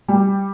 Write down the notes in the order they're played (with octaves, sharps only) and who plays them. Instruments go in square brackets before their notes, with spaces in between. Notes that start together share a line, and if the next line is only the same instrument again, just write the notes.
[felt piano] G3